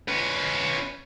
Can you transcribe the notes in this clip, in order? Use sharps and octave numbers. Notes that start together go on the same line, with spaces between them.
C#4 B4